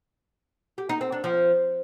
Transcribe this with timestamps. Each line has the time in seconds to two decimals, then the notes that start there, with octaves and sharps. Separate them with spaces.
0.78 G4
0.89 D#4
1.01 C4
1.12 D4
1.24 F3